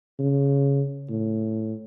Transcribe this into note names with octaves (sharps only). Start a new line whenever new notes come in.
C#3
A2